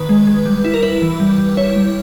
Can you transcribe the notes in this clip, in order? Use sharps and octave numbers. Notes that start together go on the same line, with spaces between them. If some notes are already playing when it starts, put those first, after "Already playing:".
Already playing: D#3 B4
G#3
G#3
G3
E4
A#4
E4 B4
E3
G3
G3
E4 C#5
G3